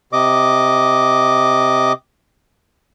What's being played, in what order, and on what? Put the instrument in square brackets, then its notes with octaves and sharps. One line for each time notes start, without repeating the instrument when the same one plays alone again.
[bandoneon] C3 D#5 D6